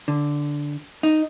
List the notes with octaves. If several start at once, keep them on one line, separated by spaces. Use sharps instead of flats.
D3
D#4